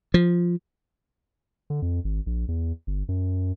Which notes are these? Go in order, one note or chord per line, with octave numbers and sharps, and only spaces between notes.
F3
D3
F2
G#1
A#1
E2
G1
F#2